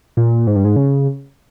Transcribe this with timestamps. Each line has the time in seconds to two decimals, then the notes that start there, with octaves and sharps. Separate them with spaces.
0.17 A#2
0.47 G#2
0.56 G2
0.65 G#2
0.76 C#3